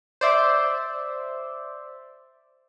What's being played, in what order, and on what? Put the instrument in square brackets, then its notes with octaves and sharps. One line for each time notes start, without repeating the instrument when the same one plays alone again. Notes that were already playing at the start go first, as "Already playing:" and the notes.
[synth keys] C5 D5 E5